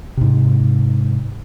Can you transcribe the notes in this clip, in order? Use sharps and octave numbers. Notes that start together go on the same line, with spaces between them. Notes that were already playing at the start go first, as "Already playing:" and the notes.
G#2 C3